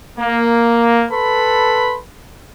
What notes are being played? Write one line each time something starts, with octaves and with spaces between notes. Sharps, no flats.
A#3
A4 B4 B5 C6